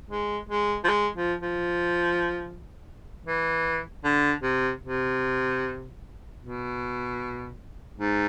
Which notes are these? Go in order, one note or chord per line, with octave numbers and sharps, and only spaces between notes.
G#3
G#3
F3
G#3
F3
F3
E3
D3
C3
C3
B2
G#2